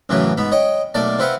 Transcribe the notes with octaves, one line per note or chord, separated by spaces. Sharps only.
A1 F#2 C#3 E3 F#3 B4
G#2 B3 B5
C#5 D#5 G5
B1 A3 A#3 D5 A5
C4 E4 B4 C5 F5 F#5